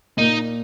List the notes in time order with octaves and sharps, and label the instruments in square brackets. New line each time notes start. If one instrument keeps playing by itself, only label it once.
[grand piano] A#2 A#3 [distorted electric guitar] D#4